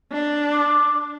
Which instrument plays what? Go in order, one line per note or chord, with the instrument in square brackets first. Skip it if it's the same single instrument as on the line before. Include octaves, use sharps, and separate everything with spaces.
[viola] D4
[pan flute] D6